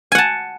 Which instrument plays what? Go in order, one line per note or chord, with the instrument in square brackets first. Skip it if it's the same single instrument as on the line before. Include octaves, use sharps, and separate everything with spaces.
[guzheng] G#5
F#5
A5